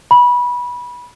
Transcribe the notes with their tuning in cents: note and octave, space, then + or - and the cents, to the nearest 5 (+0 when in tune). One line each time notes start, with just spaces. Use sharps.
B5 -20